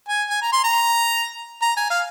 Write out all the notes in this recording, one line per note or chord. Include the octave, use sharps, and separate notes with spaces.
G#5
G#5
A#5
C6
A#5
A#5
G#5
F5